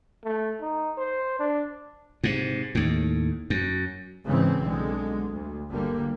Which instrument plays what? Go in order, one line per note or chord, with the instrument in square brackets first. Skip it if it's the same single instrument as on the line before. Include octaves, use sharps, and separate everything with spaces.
[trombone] A3
D#4
C5
D4
[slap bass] G#2 C3
D#2 A2
F#2
[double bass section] G#2 C#3 E3 C4
B1 D3 G#3
D2
G1 D3 G3 A#3